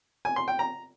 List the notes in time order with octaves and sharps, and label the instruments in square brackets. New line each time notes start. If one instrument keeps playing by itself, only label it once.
[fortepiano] G#5
C6
G5
A#5